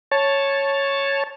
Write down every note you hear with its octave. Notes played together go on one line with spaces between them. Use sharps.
C#5 A5